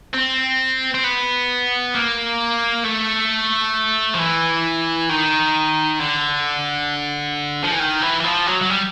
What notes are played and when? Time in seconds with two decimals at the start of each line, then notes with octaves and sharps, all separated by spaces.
0.14 C4
0.94 C4
1.04 B3
1.95 A#3
2.85 A3
4.14 F3
4.19 E3
5.09 D#3
6.00 D3
7.64 F3
7.71 E3
7.80 D#3
8.02 E3
8.20 E3
8.24 F3
8.47 F#3
8.62 F#3
8.70 G3